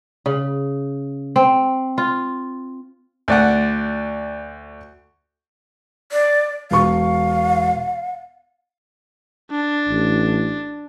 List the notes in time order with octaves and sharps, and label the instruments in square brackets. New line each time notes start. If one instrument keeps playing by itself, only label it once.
[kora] C#3
C4
F4
[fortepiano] D2 D5 F#5
[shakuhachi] D5
[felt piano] E1 C#6 [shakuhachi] F5
[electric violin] D4
[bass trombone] A1